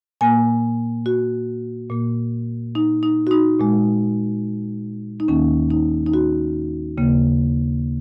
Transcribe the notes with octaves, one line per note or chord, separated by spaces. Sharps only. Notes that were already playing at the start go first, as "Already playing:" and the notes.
A#2 A#3 G#5
F#4
A#2 A#3
D#4
D#4
F#4
D#4
A#2 G#3
D#4
D#2 D#3 A#3 C#4
D#4
D#4
F#4
D#2 C#3 A#3